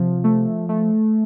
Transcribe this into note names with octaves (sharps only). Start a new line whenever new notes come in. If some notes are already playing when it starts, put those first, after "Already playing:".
Already playing: C3 F3
A3
A3